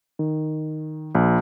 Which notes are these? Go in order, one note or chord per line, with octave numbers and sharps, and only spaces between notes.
D#3
A#1